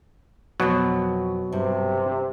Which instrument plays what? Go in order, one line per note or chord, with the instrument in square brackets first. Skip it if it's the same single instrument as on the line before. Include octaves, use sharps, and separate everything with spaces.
[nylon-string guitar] F2 B3 [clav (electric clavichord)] B2 F#3
[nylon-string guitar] G2 [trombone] C3